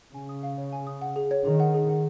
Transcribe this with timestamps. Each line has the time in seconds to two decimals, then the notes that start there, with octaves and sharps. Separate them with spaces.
0.14 C#3 G#5
0.29 D#6
0.43 F5
0.58 C#5
0.73 G#5
0.87 D#6
1.02 F#5
1.16 G#4
1.31 C#5
1.45 D#3 G#4
1.60 F#5
1.74 G#4
1.89 F#5